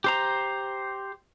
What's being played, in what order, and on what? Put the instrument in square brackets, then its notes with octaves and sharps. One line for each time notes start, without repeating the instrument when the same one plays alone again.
[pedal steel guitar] G4 C5 A#5